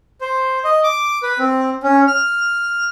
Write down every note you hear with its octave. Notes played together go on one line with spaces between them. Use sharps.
C5
D#5
D6
B4
C4
C#4
F6